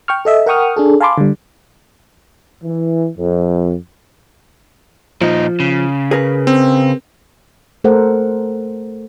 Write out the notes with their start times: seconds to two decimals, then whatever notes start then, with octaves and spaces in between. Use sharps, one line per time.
0.08 G5 C#6 F6
0.25 A4 D#5 E5
0.46 A#4 F#5 G5 C#6 D#6 F6
0.76 D4 G#4 A4
1.01 F5 G#5 A5 B5 C6 D6
1.18 D3 G3
2.64 E3
3.17 F2
5.21 A#2 F3 D#4
5.60 C#3
6.11 G#4 A#4 B4
6.47 C4
7.84 A3 A4 A#4 C5 F#5